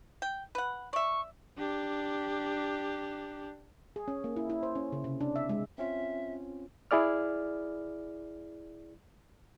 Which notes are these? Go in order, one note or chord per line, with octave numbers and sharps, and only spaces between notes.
G5
B4 F#5
D5 E5 C#6
D4 G4
G#4
C#4
A#3
E4
E4
C5
C#4
C#3
C3
D4
E5
G#3
C4 C#4 F4 E5
E4 G#4 D5 F6